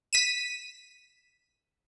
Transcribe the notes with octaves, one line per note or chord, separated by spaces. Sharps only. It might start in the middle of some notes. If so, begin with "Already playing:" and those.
B6 D#7 E7